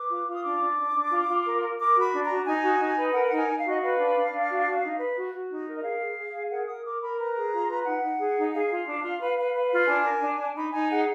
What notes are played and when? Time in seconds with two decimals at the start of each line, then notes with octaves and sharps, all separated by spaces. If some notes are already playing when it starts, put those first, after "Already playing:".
Already playing: B4 D6
0.10 F4
0.27 F4
0.35 D#6
0.43 D4 D6
0.60 D4
0.78 D4
0.94 D4
1.11 F4
1.28 F4
1.44 A#4
1.62 A#4
1.79 A#4 D6
1.96 F#4 B5
2.12 D4
2.24 A#5
2.29 F#4
2.45 D#4 G#5
2.63 F#4
2.79 D#4
2.97 B4
3.13 A#4 F#5
3.27 D#4 F#5
3.37 G#5
3.47 D#4
3.59 F#4 F5
3.70 D#5
3.81 B4 F5
3.98 D4
4.15 D4
4.32 D4
4.49 F#4
4.65 F#4
4.82 D#4
4.99 B4
5.15 F#4
5.33 F#4
5.49 D#4
5.67 A#4
5.76 D#5
5.83 G#4 F5
6.00 G#4
6.17 G#4
6.34 G#4
6.50 A#4 F#5
6.67 A#4 D#6
6.84 A#4 D6
7.02 A#4 B5
7.18 B4 A#5
7.35 G#4
7.52 F4
7.68 B4
7.86 D#4 F#5
8.03 D#4
8.19 G#4
8.36 D#4
8.53 G#4 F5
8.70 F4
8.87 D4
9.03 F4
9.21 B4
9.38 B4
9.55 B4
9.72 F4
9.87 D4 G#5
10.05 A#4
10.22 D4
10.39 D4
10.55 D#4 B5
10.72 D#4 G#5
10.89 G#4 F#5